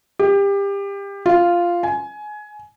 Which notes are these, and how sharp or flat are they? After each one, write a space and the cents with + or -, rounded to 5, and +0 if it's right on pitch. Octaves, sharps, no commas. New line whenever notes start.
G4 +25
F4 -5
G#5 +20